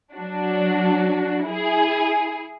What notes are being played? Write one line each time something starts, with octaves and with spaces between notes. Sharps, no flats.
F#3 D4 F#4
E4 G#4